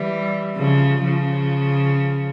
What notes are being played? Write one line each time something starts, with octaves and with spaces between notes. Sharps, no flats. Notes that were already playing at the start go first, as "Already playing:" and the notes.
Already playing: E3 G3
C#3 F3
C#3 F3